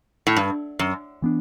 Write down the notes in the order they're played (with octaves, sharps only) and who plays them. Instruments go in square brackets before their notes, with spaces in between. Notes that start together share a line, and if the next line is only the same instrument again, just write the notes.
[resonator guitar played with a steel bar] A2
G2
F#2
[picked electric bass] E3 B3 D4